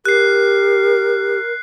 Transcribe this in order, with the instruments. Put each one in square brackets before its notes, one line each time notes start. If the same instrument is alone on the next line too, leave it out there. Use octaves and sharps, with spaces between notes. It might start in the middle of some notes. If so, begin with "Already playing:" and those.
[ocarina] G4 [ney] A#4 [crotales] F#6 C7